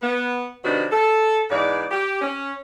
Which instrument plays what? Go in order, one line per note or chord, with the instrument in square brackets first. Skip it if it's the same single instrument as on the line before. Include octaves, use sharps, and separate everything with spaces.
[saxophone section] B3
C3 D#3 F#3 B3 D4 F#4
A4
E2 G#2 B4 D5
G4
C#4